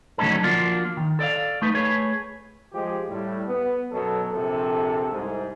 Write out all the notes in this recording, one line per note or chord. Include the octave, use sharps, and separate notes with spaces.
D3 F#3 A3 C#4 D#4 A4
F3 A#3 D4 F4 F#4
D#3
A4 D5 D#5 F5
A3 D#4 B4
A3 G#4 B4 C#5
F3 G#3 G4
A2 G3
B3
F#2 B2 F#3 A4
A#1 C3 A4
C2 G#2